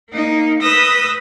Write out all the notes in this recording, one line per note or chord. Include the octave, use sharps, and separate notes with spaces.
A#3 D#4
B4 D#6 E6 G6 A#6